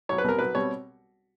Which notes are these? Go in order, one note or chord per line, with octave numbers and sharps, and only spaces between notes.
B1 C#5
B4
B2 G3 C4 A#4
B1 B4
B2 G3 C4 C#5